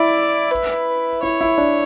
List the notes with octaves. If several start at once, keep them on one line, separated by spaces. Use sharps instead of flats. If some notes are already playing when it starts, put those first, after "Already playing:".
Already playing: E4 D5
B4
E4 C#5
E4
D4